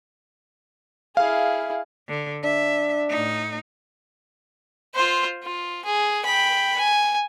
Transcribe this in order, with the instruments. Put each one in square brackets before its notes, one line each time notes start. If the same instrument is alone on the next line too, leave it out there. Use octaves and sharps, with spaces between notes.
[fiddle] E4 G#4 [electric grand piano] F5
[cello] D3
[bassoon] D4 [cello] E5
[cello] A2 D#4
[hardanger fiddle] F4 C5
F4
G#4
G5 B5
G#5